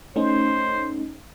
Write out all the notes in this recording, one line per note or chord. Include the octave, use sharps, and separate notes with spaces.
A3 C#4 D#4 C5